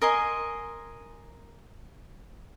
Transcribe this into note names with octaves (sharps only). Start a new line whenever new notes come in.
A#4 D#5 G#5 C6